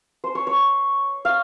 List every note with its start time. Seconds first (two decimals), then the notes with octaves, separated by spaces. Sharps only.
0.24 C5
0.35 C#5
0.47 C#5
1.25 F5